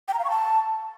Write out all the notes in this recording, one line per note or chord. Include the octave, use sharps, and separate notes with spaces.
G5
A#5
F5
C#6
A5